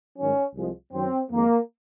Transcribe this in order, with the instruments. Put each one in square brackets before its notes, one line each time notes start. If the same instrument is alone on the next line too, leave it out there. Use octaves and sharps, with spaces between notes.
[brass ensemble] G#2 D#3 F#3 C#4
C2 C3 F3 G#3
F#2 D#3 F#3 C4
F2 D#3 G#3 A#3